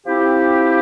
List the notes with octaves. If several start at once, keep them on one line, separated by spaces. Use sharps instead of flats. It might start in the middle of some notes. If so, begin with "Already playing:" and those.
F3 C4 E4 G4